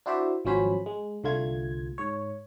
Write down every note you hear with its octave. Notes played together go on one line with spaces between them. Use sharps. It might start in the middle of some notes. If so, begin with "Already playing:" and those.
D4 E4 F#4 C5 D5 E5
G#1 F3 F#3 C#4 C5 B5
G#3
C2 D3 A3 F4 G#6
G#2 C#5